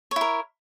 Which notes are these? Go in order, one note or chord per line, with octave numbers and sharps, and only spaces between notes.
E4 A#4 C#5